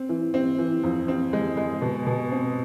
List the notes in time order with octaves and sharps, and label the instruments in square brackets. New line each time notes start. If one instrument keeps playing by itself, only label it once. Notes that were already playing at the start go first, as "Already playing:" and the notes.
Already playing: [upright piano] C4
E3
C4
E3
F2
C4
G#3
G#3
B2
B2
C4